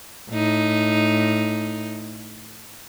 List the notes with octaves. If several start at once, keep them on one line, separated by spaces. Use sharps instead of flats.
A2 D#4